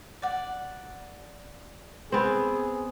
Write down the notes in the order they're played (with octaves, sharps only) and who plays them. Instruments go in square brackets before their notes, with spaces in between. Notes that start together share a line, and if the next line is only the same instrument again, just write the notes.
[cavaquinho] D5 F#5
[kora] B3 C4 [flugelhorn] G#4